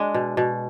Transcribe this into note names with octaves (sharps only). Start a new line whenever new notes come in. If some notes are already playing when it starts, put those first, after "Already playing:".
Already playing: G#3 D4
B2
B2